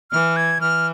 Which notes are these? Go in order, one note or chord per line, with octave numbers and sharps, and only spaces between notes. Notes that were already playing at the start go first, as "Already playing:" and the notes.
E3 F6
G#6
E3 F6